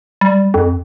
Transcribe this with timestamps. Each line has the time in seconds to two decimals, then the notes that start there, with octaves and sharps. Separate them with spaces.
0.21 G3
0.54 F2